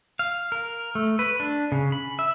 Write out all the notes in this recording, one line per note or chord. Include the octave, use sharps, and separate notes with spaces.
F5
A#4
A3
B4
D4
C#3
B5
E5